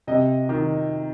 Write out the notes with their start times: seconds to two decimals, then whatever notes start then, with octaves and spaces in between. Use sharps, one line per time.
0.07 C3 D#5
0.49 D#3